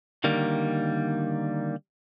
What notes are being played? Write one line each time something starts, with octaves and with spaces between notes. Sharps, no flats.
D3 D#3 G3 A#3